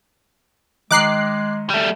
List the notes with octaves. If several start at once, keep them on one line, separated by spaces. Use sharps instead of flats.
D#3 G#3 D#5 A#5 D6 F#6 C7
G3 A3